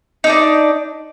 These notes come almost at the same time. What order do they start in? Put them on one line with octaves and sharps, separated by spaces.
D#4 D4 D5